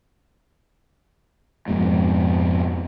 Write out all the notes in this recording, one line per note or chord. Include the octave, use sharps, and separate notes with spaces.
F2 G#2 B2 G#3